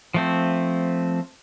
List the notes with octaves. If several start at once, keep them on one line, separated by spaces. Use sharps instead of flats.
F3 A3 C4